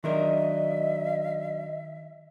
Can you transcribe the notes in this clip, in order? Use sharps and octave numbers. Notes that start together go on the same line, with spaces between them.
D#3 F#3 D4 A#4 D#5 E5